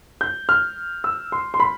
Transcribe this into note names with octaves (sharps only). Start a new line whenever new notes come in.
G6
F6
E6
C6
C6
B5